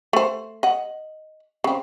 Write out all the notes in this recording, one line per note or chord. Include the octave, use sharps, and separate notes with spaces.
A3 C5
D#5 F#5
C#3 C4